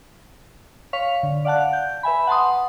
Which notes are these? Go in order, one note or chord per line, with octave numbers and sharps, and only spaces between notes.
C#5 F5 C#6 B6 F7
D3
D5 F5 F#5 A5 F#6
G6
B4 E5 G#5 B5
F#5 A5 C6 D#6